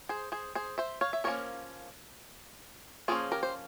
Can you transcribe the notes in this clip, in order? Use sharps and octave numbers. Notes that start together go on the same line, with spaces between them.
G#4 C5
G#4 C5
G#4 C5
C5 E5
C#5 F5
E5
F3 A#3 C#4 A#4 C#5
F3 A#3 C#4 G#4 C5
G4 A#4
C5